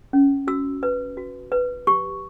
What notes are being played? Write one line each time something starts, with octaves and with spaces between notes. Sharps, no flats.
C#4
F#4 E6
B4
F#4
B4
G4 C#6